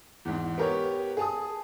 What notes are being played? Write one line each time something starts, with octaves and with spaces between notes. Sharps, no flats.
E2 G#2
B3 G4 A#4 B4 C#5
G#4 A5 D#6